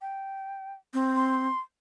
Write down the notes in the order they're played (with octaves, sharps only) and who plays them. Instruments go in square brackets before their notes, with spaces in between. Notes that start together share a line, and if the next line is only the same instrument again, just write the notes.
[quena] G5
[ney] C4
[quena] C6